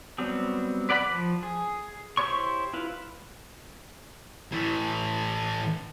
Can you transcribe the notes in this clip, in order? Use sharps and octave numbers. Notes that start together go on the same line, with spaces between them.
F#3 G3 B3 C4
B4 D5 F#5 G#5 B5
F3
G#4
E4 G4 C5 C#5 C#6
E4 F4 B4
A2 E3